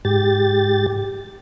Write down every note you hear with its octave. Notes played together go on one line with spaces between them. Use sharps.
G#2 G4 A6